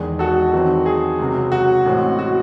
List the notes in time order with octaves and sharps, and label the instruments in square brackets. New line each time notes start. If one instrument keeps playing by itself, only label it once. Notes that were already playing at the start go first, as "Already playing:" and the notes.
Already playing: [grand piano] E1 E2 D#3 G#3 G#4
F#4 A4
E2 D#3 F#3 C4
G#4
C#2 C3 F#3
F#4
A1 A2 G#3 C4
F#4